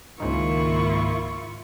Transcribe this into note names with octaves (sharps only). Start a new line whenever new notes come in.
C#2 G#2 D#3 A#3 E4 F4 C#6